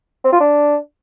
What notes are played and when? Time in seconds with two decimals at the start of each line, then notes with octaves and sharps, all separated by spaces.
0.24 C4
0.32 F4
0.40 D4